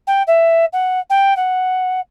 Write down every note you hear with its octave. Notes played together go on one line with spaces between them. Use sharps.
G5
E5
F#5
G5
F#5